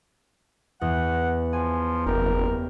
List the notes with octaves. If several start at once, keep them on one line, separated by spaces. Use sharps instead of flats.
E2 F#5
F3 G#5
F#1 G4 A#4